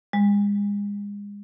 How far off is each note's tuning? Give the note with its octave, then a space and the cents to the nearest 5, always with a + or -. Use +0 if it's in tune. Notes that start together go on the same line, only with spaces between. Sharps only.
G#3 -35